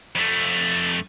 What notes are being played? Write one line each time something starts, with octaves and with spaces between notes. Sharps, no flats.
F2 A3